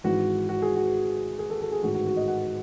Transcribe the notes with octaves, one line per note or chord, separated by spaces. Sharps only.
G#1 G#2 E3 F#4
F#4
G#4
F#4
G#4
A4
A4
G#4
A1 G#2 D#3 F#4
F#4
F#4
D#5
F#5